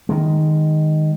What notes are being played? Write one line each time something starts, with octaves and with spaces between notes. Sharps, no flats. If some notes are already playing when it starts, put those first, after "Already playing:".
D#3 G#3